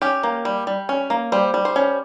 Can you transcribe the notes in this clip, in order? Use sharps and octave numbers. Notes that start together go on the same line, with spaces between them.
C#4 G4
A#3
G3
G3
C#4
A#3
G3 C5
G3
C5
C#4